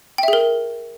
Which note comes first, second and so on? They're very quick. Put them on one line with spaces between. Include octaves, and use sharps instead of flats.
G5 E5 G#4 A#4